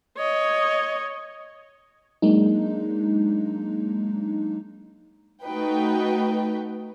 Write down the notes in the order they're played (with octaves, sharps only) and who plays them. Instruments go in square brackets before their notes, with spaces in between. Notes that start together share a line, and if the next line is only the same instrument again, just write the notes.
[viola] C#5 D#5
[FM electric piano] F#3 G#3 A#3 D4 D#4
[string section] A3 D#4 F#4 B4 G5